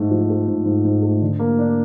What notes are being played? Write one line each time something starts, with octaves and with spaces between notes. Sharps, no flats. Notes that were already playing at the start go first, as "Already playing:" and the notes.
Already playing: G#2 A3
F3
A3
G#2
G#2
G#2
A3
D3
A#3
D4